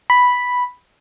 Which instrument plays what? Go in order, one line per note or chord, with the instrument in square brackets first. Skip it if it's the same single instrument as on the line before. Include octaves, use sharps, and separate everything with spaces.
[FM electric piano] B5